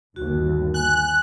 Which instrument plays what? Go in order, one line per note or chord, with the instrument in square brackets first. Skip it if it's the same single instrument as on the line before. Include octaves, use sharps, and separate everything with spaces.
[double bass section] G1 D#2 [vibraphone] F#4
[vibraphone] G#5 [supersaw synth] F#6